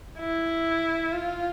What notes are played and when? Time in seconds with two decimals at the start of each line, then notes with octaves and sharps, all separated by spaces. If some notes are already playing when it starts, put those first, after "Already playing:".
0.19 E4
1.12 F4